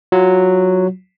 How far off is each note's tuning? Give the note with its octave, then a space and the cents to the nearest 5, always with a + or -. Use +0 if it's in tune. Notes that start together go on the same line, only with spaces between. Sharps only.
F#3 +0 F4 +5